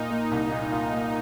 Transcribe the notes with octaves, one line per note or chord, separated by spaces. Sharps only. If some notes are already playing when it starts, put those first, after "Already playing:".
Already playing: A#2 D#4 F4
A#3
C2
A#2
F4
A#3